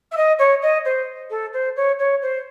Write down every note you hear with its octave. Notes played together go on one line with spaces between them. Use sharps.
E5
D#5
C#5
D#5
C5
A4
C5
C#5
C#5
C5